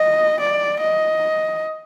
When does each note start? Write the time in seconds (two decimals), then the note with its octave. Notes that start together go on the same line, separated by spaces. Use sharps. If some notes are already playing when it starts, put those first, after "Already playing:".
Already playing: D#5
0.40 D5
0.80 D#5